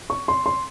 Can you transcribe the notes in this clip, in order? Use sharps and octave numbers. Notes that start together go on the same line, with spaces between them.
C#6
C6
C6